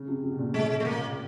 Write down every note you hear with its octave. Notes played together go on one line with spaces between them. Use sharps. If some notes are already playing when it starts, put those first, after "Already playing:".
Already playing: C#3
C3
C3
B2
A#2
A2 G#3
A3
A#3